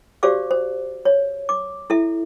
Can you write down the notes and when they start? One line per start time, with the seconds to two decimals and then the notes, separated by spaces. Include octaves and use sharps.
0.23 F#4 G4 C5 D5 F5 D6
0.51 C5
1.05 C#5
1.49 D6
1.90 E4 A4 E5